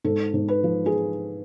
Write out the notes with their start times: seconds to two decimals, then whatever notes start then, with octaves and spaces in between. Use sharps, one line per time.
0.04 G#2 A4
0.34 G#2
0.48 B4
0.64 F3
0.86 G#4